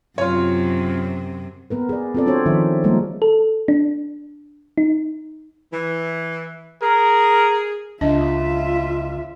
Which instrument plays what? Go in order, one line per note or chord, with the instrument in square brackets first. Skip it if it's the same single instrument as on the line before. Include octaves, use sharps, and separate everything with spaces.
[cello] F#2 C3 [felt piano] F4 C#5
[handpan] B3 A#4 B4
G#4 D5
C4 F4 A4 D5
C4 D4 F#4 C5 C#5
D#3 F3 D#4 E5
F3 G3 G#3 A#3 F4 A#4
[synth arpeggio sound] A4
D4
D#4
[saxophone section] E3
[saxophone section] G#4 [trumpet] A#4
[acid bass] C#2 [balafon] D4 D#5 [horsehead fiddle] F4 E5